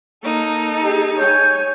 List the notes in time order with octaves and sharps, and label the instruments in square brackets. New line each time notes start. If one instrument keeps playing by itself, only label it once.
[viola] A#3 [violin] D#4 A4
[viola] G4 G#4
[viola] C#5 G#5 [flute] G6